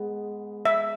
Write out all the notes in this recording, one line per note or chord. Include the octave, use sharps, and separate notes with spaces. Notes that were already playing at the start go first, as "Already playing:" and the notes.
Already playing: G#2 G#3 B3
E5